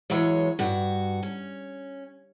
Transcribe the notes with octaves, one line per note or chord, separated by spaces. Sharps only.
E3 F#3 G#3 C#5
G2 F#4
C#4